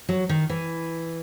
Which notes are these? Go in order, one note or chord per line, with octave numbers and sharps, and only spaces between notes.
F#3
D#3
E3